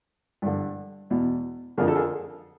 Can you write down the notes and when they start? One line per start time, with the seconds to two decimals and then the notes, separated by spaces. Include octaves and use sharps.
0.42 G2 D3
1.10 E2 B2
1.77 F2 D3 G#4 A#4
1.88 A4
1.95 G#4 A#4